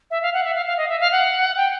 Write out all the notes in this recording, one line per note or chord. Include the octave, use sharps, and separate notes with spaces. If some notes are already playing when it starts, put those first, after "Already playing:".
E5
F5
F#5
E5
F5
F5
D#5
E5
F5
F#5
G5